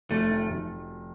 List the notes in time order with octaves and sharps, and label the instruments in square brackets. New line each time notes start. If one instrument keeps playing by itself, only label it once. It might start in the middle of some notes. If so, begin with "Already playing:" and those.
[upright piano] F1 [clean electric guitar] A3
[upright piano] D#3
F1